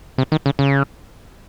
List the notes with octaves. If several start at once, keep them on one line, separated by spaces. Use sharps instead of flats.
C3
D#3
C#3
C#3